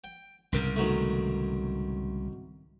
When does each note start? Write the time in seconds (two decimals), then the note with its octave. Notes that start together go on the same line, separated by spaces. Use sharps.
0.04 G5
0.52 C2 G#2 C#3 A#4 G5
0.76 D#3 F#3 A3